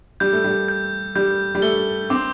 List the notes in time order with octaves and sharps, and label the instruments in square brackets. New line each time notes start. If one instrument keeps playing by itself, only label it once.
[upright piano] G3 [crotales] G6
[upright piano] A3
G3
[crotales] G6
[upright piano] G3 [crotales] G6
[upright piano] G3
[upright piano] A3 [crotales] G7
[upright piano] C4 [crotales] D6